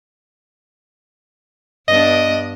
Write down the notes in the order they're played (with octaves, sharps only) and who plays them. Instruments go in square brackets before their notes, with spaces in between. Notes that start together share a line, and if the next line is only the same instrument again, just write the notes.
[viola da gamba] G2 B3 D4 [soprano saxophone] D#5